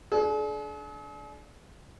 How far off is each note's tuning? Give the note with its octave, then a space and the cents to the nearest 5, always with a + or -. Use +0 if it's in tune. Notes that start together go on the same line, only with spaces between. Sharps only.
D4 +0 G#4 +45